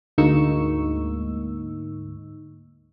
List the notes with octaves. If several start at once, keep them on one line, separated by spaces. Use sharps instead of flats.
D2 G#2 A#3 D#4 C#6 E6